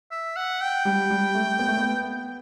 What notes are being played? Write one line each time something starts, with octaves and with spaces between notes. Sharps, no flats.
E5
F#5
G5
G3
G3
A3
B3
A3
B3